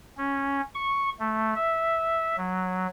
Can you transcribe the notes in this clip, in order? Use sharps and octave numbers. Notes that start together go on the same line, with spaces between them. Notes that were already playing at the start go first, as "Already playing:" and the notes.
C#4
C#6
A3
E5
F#3